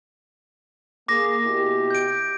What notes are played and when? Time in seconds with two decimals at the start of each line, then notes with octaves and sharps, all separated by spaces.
1.08 A#3 G#4 D6 A#6
1.43 B2 E4 G4
1.90 G6 D7